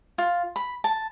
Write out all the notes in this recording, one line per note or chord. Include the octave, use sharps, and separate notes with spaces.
F4
B5
A5